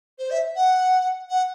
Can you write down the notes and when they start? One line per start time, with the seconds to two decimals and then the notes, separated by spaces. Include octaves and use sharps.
0.19 C5
0.31 E5
0.56 F#5
1.30 F#5